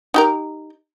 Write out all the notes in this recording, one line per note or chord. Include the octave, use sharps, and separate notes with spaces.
D#4 G4 A#4